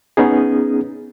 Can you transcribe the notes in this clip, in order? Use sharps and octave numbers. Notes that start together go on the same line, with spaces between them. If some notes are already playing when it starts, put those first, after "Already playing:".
B3 C#4 D#4 G#4